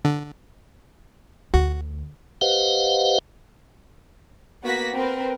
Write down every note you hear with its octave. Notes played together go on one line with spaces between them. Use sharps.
D3
D2 F#4
G4 B4 C5 D#5 F5 F#5
A#3 B3 F#4 F#5 A#6 B6
C4 A#4 B4